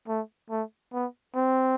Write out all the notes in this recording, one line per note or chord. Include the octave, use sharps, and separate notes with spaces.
A3
A3
B3
C4